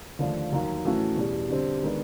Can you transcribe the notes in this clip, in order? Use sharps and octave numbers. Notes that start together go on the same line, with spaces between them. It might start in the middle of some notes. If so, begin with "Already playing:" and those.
D#2 D3 F3 A3 D4
D#2 D#3 F#3
A2 E3 A3 C#4 F#4
E2 B2 G3
D3 G3 C4
D#3 G#3 B3 D4